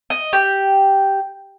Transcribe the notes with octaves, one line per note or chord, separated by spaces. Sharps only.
D#5
G4